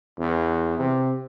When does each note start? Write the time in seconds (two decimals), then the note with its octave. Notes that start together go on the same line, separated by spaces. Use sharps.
0.18 E2
0.78 C3